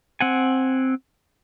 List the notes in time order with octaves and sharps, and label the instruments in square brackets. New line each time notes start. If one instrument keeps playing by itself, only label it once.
[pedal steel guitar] C4 F#5 G#5